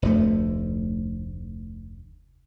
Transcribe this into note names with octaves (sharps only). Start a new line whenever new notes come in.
F1 D2 F3 A3